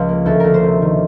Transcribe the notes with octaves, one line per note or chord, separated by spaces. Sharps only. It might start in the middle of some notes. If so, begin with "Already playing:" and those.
Already playing: C#2 F3
A#3
D2 A4
D2 A#4
C5
C3
D#3